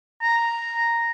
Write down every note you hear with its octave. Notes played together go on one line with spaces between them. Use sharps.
A#5